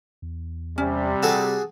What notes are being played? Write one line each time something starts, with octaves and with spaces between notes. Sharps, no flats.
E2
C3 G3 C#4
F#4 G#4 A4 D5